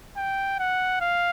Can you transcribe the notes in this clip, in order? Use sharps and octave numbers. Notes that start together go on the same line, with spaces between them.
G5
F#5
F5